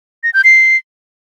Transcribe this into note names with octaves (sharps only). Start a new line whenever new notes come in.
A#6
G6
C7